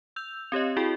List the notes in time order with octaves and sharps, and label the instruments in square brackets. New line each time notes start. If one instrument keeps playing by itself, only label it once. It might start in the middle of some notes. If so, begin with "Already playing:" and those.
[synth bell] E6 G6 F7
C4 G4 C#5 D#5
E4 F#4 G#4 G5